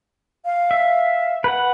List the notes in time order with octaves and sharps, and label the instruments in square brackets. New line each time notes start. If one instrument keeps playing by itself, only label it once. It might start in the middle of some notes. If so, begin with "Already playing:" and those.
[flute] F5
[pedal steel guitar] E5
B4 F#5